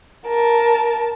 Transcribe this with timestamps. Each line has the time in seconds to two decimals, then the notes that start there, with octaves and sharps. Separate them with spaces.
0.27 A#4 A5